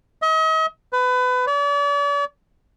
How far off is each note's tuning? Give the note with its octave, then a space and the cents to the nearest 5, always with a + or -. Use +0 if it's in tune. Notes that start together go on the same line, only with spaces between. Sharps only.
D#5 +40
B4 +25
D5 -45